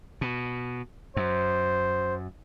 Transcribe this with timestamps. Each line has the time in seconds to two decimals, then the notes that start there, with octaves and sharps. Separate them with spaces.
0.21 B2
1.17 F#2 C5